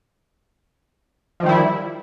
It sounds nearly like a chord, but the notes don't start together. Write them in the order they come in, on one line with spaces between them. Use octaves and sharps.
F3 D#3 G3 E4